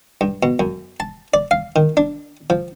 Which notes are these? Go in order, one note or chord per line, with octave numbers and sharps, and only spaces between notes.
G2
B2
F#2
A5
D5
F5
D#3
D4
F3